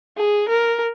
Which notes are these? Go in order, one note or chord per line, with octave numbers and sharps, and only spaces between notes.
G#4
A#4